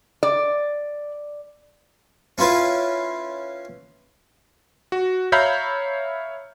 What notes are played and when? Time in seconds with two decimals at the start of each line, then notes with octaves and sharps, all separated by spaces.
0.23 D5
2.38 C#4 E4 F4 B4 F5
4.92 F#4
5.32 C#5 E5 F5 A#5 B5 G6